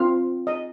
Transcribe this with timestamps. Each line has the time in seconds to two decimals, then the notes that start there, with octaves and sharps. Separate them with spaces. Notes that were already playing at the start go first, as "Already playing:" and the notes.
Already playing: C4 F4 F5
0.47 D#5